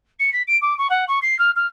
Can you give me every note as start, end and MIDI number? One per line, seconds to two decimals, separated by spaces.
0.19 0.32 97
0.32 0.42 95
0.47 0.57 98
0.61 0.76 86
0.78 0.87 85
0.89 1.04 78
1.08 1.19 85
1.22 1.37 96
1.38 1.50 89
1.55 1.66 89